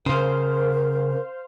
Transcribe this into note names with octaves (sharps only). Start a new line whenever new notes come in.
C#3 A#4 C5 F5